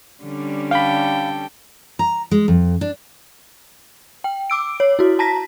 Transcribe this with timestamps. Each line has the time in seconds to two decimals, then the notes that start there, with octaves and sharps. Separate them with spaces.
0.23 D3 G3 C#4
0.71 A4 F5 G5 B5
1.99 A#5
2.31 G#3
2.48 F2
2.81 D4
4.24 G5
4.50 D6 E6 D7
4.80 C#5
4.99 E4 F#4
5.19 A5 A#5 A#6 B6